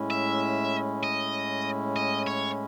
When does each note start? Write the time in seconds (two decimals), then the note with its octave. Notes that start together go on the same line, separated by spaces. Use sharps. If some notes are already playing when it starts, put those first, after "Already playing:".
Already playing: A2 G#3 C#4 E4
0.11 E5
1.03 D#5
1.96 D#5
2.27 C#5